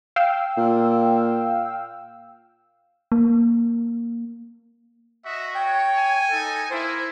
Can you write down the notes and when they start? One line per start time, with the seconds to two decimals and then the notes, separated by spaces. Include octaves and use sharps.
0.16 F5 G5 E6
0.57 A#2
3.12 A#3
5.25 F#4 D#5 E5
5.56 C#5 G5
5.97 G#5
6.30 D#4 A4
6.71 A#3 E4 C5